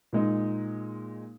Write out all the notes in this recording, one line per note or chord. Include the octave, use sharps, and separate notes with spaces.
A#2 G#3 D#4